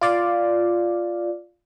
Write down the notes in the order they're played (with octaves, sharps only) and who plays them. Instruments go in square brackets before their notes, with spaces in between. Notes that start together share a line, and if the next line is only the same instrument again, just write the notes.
[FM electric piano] F4 D5 F5